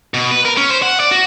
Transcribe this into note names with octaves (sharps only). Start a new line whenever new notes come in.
B2
B4
A#4
C#4
C5
F#5
D5
F#4